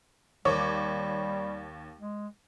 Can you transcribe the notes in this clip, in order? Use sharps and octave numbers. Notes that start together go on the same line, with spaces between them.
D#2 G3 C#5 D6
G#3